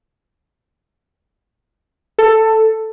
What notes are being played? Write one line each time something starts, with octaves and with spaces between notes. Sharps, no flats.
A4